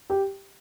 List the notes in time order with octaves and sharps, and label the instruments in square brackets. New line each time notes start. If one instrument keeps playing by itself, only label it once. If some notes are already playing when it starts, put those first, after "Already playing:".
[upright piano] G4 G5